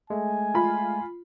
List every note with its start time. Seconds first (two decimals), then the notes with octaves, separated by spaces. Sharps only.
0.10 G#3 A3 G#5
0.54 F4 B5